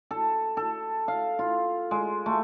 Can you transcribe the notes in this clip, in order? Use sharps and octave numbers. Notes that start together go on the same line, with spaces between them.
A4
A4
F5
F4
G#3
A3